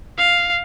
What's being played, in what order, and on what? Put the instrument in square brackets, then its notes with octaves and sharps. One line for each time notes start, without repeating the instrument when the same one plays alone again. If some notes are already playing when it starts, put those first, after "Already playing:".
[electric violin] F5